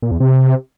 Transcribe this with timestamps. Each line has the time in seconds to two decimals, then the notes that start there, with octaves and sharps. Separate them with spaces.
0.02 A#2
0.11 E2
0.20 C3